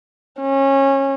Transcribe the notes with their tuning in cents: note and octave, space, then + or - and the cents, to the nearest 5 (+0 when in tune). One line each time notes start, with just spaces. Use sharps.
C#4 -25